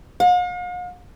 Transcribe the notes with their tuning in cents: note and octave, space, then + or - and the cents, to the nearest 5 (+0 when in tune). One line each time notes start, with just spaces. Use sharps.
F5 +45